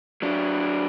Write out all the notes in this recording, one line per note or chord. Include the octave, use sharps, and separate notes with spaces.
F#3 D4